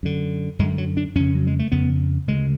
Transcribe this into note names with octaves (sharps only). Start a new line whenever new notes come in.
F#2 D3
F#2 D3 G#3
F#3
D4
F2 C#3 C#4
F#3
G#3
A3
F2 C#3 B3
D2 C#3 G#3